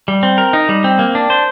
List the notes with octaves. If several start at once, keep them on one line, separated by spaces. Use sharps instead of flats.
G3
C4
A#4
D#4
G3
C4
A#3
D4
C5